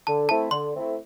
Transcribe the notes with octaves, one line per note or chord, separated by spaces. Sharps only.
D3 A5
A3 C4 E4 A5
D3 C6
A3 C4 E4